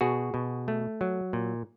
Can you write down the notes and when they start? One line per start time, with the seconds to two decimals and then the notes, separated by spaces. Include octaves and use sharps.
0.01 B2 F#4 G#4
0.34 B2
0.68 A3
1.01 F#3
1.33 A#2